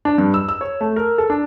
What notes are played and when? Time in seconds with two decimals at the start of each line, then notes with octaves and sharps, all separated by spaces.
0.05 D4
0.18 G2
0.34 E6
0.49 E6
0.61 C#5
0.81 A3
0.96 A#4
1.18 A4
1.30 D4